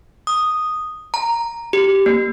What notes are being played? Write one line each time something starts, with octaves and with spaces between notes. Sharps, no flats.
D#6
A#5
G4
A#3